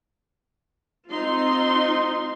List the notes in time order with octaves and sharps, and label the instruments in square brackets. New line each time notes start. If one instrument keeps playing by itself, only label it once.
[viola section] C4 D#4 F4 C6